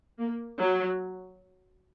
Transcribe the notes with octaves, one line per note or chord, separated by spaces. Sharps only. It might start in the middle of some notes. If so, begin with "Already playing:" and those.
A#3
F#3